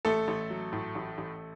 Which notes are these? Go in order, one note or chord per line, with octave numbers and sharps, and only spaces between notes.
A1 A3 A4
A1
F#3
A2
A1
A1